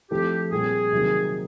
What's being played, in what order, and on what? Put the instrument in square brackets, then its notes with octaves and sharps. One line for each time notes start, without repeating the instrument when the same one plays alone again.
[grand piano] F3 A3 C4 E4 A4 [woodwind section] G4
[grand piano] A#2 G3 C4 [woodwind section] G#4
[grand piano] C3 D#3 F#3 A#3